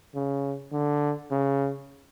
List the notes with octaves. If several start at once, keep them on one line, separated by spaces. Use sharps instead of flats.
C#3
D3
C#3